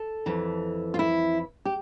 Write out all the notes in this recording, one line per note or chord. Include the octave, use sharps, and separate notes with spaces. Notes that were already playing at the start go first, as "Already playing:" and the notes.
Already playing: A4
F2 E3
F4
E4
G4